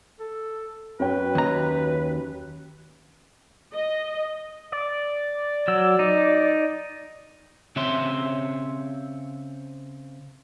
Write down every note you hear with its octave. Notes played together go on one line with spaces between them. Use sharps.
A4
F#2 B4 C#5 G5
D#2 A#5
D#5
D5
F#3 E6
D#4
C#3 C4 C#5 E5 C6